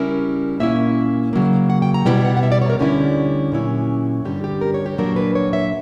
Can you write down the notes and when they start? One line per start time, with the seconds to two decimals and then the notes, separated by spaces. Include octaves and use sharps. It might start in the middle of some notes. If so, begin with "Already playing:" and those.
Already playing: C#3 G3 C#4 E4 A#4
0.60 A#2 A#3 C#4 E4 E5
1.33 C#3 F#3 A#3
1.70 F#5
1.82 G5
1.94 A#5
2.06 B2 G3 B3 E4 G5
2.25 F#5
2.37 F#5
2.43 E5
2.52 D5
2.62 C#5
2.70 A#4
2.79 D2 D3 G3 C#4 E4 G4
3.52 A#2 F#3 C#4 E4
4.25 G2 D3 G3 G4
4.44 G4
4.61 A#4
4.74 C#5
4.86 G4
4.98 A#2 F#3 A#3 D4 A#4
5.16 B4
5.35 C#5
5.53 E5